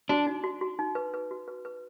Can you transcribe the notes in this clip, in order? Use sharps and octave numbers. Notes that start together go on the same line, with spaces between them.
D4 F#4
D#4
F#4
F#4
D#4
B4
B4
F#4
B4
B4